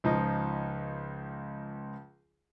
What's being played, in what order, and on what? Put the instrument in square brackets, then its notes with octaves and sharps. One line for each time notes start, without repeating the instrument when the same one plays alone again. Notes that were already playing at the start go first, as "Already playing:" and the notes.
[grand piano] C#2 F3 D#4